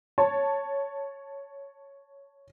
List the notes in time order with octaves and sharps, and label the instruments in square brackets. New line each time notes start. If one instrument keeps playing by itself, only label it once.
[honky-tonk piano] C#5 A5